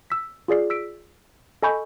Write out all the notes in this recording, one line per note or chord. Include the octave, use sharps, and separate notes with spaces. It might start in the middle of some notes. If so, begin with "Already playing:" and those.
E6 B6
F4 G#4 D5 C7
E6 B6 D7
A4 D#5 G#5 B5 C#6 G6